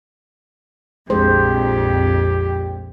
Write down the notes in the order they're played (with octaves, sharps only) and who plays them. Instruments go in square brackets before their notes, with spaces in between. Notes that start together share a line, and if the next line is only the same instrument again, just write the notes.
[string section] A#1 F2 [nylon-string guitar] G#3 D4 [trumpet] G4 [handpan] C5